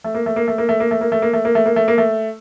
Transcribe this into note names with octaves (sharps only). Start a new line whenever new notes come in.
A3
A#3
A3
A#3
A3
A#3
A3
A#3
A3
A#3
A3
A#3
A3
A#3
A3
A#3
A3
A#3
A3